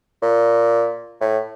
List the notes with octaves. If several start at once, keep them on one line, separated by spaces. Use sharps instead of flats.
A#2
A2